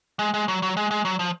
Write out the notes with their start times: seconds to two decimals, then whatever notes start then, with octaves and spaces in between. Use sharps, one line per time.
0.19 G#3
0.34 G#3
0.48 F#3
0.62 F#3
0.77 G#3
0.91 G#3
1.05 F#3
1.19 F3